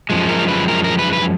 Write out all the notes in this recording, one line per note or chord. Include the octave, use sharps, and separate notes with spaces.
F#2 F3 G#3
A#4
B4
A#4
A#4
B4
B4